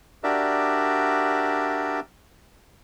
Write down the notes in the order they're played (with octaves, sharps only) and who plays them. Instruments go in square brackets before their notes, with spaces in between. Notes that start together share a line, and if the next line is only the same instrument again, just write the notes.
[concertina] D4 F#4 G4 A#4 D5 E5